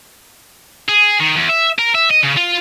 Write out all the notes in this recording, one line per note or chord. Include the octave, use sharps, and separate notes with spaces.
G#4
D#3
E2
E5
A#4
E5
D#5
C#3
F4